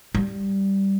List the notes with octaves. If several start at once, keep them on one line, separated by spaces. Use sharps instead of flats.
G3